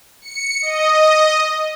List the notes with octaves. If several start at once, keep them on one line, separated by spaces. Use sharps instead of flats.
C#7
D#5